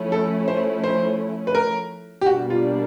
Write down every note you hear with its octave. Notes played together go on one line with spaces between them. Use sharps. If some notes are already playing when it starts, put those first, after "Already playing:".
Already playing: F3 A3 C#4 E4
A4
C5
C5
B4
A#4
G4
B2 G3 A#3 D4 F#4
F4